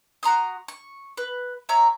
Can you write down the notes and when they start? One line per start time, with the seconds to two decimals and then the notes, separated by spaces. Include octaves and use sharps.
0.23 F#4 A#5 C6 D#6
0.68 C#6
1.17 B4
1.69 C#5 E5 A#5 C#6